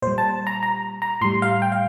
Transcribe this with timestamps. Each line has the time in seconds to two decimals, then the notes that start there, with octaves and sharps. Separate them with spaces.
0.02 A#2 G3 C5
0.18 A5
0.47 A#5
0.63 A#5
1.02 A#5
1.21 A2 G3 C6
1.42 F5
1.62 G5
1.72 F5